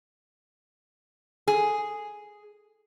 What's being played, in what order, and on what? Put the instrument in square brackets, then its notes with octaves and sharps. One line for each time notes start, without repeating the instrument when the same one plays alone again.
[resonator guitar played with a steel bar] G#4